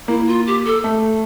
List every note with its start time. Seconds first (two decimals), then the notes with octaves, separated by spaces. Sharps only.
0.08 A#3 E4
0.27 F4
0.47 G4
0.65 A4
0.84 A3 A4